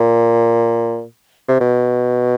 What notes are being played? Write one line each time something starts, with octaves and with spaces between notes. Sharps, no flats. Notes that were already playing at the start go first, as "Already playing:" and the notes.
Already playing: A#2
C3
B2